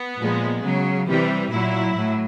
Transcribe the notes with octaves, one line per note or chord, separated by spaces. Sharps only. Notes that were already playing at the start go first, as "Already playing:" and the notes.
Already playing: B3
A#2 F3 G#3
C#3 F#3
C3 E3 G3
A#2 F#3 E4
A2 F#3